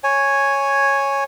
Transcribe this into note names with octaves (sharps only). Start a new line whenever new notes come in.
C#5 G#5